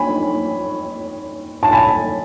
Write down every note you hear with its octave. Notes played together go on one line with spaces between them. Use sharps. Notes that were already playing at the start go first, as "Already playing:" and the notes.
Already playing: G#5 B5
A5
G#5 B5